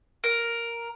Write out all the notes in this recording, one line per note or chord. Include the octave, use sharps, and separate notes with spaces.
A#4